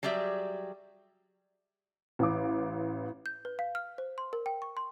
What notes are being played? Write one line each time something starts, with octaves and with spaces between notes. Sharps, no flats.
F#3 G3 G4 G#4 E5
A1 F5 D6
G6
B4
F5
F6
C5
C6
A#4
G5
C#6
C6